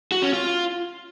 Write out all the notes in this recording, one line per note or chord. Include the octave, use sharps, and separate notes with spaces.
F#4
C#4
F4